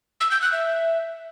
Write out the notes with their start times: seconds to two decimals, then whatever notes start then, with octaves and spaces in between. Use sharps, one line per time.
0.20 E6
0.31 G6
0.42 F#6
0.53 E5